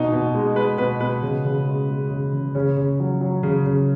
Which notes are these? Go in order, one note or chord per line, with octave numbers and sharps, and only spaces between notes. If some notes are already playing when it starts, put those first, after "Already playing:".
Already playing: B2 D#4
B2
G#3
G#3 B4
B2 B4
B2 B4
C#3
C#3
G#3
G#3
C#3
C#3
C#3 C#4
C#3
F#3
F#3
C#3
C#3